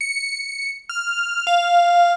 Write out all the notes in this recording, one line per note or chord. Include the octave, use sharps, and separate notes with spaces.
C#7
F6
F5